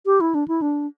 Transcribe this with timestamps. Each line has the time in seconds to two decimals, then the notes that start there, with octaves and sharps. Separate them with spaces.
0.06 G4
0.21 E4
0.35 D4
0.48 E4
0.62 D4